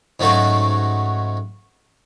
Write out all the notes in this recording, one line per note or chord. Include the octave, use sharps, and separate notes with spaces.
G#2 C#3 F#3 A3 D#4 F#4